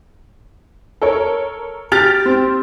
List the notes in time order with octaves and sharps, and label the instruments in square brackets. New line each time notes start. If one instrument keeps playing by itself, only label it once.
[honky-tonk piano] A4 A#4 C#5
[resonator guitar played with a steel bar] G4 [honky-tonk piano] F6 A6 F7
[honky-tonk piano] C4